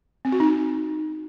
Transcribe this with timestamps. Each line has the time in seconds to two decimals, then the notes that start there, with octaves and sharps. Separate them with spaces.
0.25 C4
0.32 F#4
0.40 D#4